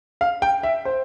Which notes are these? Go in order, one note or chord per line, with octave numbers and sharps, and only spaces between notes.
F5
G5
E5
C5